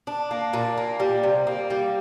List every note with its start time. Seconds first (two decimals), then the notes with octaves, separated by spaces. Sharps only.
0.07 D4
0.31 A#3
0.53 A#2
0.77 A#3
1.00 G3
1.23 C3
1.47 A#3
1.70 G3